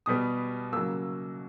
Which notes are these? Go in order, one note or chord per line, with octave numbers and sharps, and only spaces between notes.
B2 G3 B3 D#6
C#3 F#3 A#3 E6